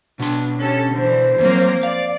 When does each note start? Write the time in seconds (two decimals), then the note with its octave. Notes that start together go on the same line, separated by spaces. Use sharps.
0.20 B2 D4 C6
0.58 C#4 D4 G4 A4
0.94 D3 E3 C5
1.38 D#2 F3 F#3 A#3 C4
1.83 D5 F5